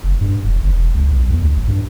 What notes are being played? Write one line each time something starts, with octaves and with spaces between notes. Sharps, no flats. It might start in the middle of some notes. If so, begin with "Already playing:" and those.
F#1
G2
E1
G1
E1
C#2
B1
E2
D2
A1
G2